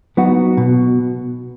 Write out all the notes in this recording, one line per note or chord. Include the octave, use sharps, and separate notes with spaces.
F#3 B3 D#4 F#4
B2